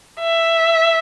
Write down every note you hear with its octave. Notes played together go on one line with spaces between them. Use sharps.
E5